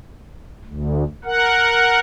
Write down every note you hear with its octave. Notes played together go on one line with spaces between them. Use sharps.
D2
A#4 F#5